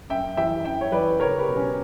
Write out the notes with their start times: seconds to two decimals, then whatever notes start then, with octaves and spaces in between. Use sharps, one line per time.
0.09 F#2 E5 G5
0.37 E3 E5 G5
0.65 F#2 E5 G5
0.81 C#5
0.92 E3 B4 D5
1.20 C#2 A#4 C#5
1.39 G4 B4
1.47 B2 F#3
1.57 C#4